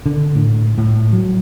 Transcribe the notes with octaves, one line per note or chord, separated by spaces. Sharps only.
D3
A2
A2
F#3